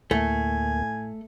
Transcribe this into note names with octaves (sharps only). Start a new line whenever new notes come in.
D2 A2 A3 A#3 G#5